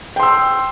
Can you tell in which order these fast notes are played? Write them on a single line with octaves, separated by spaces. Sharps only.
G5 C6 E6